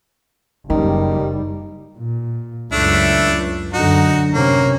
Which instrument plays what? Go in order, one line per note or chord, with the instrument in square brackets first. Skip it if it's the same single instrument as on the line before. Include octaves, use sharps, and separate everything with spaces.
[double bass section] F#1 G3 [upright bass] F#2 [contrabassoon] D#3
[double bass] A#2
[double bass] C#2 F#2 [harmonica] A3 D4 E4
[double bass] F#2 D3 [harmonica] D#4 F#4
[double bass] C3 C#4 [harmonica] A#3